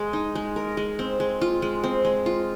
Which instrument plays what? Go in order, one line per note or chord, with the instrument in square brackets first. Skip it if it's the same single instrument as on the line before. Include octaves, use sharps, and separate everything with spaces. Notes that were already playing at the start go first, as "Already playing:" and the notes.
Already playing: [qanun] G#3
D#4
G#3
A#4
G#3
C4
G#3
F4
G#3
C4
G#3
F4